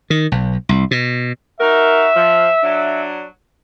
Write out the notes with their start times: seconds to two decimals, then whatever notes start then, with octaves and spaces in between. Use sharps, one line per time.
0.10 D#3
0.32 B1
0.69 C2
0.91 B2
1.60 D#4 F#4 A#4 E5
2.16 F3
2.63 F#3 D4